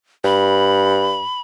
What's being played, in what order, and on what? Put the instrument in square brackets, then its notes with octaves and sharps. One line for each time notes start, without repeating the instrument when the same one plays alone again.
[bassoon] G2 [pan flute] B5